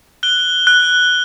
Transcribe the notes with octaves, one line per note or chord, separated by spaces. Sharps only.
F#6 G7
F#6